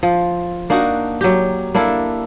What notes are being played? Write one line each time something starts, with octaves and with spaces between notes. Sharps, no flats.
F3
A#3 D4 D#4 F#4
F#3 G4
A#3 D4 E4 A4